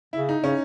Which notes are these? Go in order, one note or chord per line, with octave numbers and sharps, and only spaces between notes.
C#3 E4
D#4
C#3 C#4